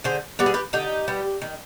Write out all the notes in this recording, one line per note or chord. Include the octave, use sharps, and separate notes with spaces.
D3 G#4 C5
G3 B3 B4
G#4
G4 B4
D3 D#4 G4
G3 B3
D#3